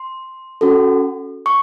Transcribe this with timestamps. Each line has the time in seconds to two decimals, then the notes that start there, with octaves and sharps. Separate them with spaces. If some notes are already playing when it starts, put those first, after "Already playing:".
Already playing: C6
0.61 C#4 F#4 A4
1.46 C#6